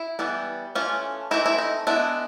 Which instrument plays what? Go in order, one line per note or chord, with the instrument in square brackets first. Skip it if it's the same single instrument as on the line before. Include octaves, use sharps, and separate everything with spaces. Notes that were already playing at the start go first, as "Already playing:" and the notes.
Already playing: [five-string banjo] E4
E3 G3 B3
E3 A3 C#4 F4
E3 A3 C4 D#4 E4
E4
D#4
G#3 B3 D4 E4